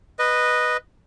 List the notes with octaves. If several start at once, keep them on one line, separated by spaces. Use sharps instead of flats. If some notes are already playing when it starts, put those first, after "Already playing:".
B4 D#5